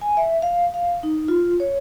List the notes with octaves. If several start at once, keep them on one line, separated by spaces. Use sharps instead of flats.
G#5
E5
F5
F5
D#4
F4
C#5